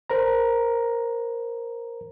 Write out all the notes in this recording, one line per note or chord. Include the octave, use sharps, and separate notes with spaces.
A#4 C5 A#5